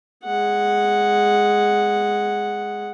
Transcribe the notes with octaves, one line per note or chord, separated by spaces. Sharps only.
G#3 F#5